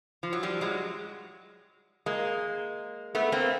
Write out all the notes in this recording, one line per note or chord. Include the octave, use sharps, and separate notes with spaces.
F3
F#3
F3 G3
F#3 G#3
G#3 A#3
A3 B3
A#3 C4